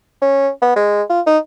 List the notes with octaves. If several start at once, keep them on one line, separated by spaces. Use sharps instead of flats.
C#4
B3
G#3
F4
D#4